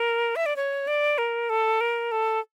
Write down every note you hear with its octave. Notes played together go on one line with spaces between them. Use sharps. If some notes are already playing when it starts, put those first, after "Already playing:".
Already playing: A#4
E5
D5
C#5
D5
A#4
A4
A#4
A4